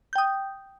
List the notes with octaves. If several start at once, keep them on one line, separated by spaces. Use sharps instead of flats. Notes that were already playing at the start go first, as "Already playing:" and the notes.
G5 D#6 G6